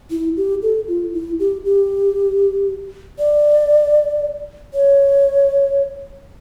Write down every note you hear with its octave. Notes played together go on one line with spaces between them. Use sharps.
E4
G4
A4
F4
E4
G4
G4
D5
C#5